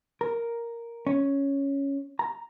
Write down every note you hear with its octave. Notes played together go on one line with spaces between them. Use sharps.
A#4
C#4
A#5